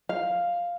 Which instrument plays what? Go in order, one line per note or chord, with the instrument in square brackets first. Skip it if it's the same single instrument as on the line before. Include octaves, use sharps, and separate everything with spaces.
[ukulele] F5